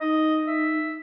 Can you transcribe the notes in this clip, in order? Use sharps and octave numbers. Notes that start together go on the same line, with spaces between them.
D#4 D#5
E5